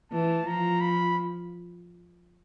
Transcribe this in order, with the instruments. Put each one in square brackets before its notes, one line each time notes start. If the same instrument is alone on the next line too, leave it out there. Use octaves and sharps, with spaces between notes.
[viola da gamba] E3 [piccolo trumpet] A5
[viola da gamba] F3 [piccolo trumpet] A#5
[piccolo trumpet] B5